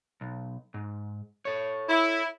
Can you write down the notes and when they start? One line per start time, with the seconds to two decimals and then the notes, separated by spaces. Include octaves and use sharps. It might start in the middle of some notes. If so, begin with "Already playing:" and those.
0.21 B1
0.74 G#2
1.45 A4 C#5
1.89 E4